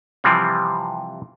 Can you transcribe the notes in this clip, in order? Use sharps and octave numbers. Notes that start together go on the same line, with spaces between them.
C3 E3 F3 G3 C4